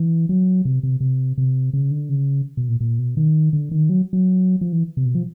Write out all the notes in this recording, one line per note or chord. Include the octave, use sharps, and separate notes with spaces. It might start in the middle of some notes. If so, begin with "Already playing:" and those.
Already playing: E3
F#3
C3
C3
C3
C3
C#3
D3
C#3
B2
A#2
A#2
B2
D#3
D3
D#3
F#3
F#3
F3
E3
C3
B2
F3